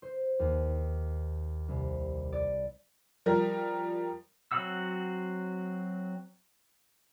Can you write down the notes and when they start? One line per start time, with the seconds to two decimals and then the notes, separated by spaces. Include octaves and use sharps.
0.02 C5
0.39 D#2
1.68 C2
2.32 D5
3.26 F3 G3 A#4
4.52 F#3 C4 F#4 F#5 E6